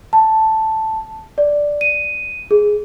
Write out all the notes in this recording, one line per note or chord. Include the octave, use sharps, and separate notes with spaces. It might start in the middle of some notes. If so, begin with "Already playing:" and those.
A5
D5
D#7
G#4